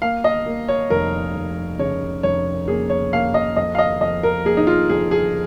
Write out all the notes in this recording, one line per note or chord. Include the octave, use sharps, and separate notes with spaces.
A#3 F5
D#5
A#3
C#5
F1 A#4
F1
C#3 C#5
F1 C#5
A#3 G#4
C#5
A#3 F5
D#5
F2 D#5
F5
D#5
F2 D#5
A#4
A#3 G#4
D#4
F4
F2 G#4
G#4